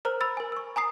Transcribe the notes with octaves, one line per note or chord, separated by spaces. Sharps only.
A#4 C5 A#5 F6
B5 E6 A6
A#4 G#5
C#6 E6
G#5 A#5 D#6 C7